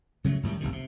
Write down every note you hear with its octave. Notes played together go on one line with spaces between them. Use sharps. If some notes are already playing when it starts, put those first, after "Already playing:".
C#3 F#3 G#3 A3
F#2 A2 D#3 G3
F1 A#1 C3 D#3
C3